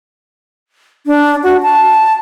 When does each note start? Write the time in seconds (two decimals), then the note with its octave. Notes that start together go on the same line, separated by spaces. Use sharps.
1.07 D4
1.43 F#4
1.63 A5